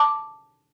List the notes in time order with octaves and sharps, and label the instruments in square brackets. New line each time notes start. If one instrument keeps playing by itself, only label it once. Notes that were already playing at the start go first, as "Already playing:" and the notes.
Already playing: [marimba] A5 D6